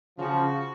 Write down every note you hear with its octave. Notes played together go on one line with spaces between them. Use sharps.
C#3 F3 F#4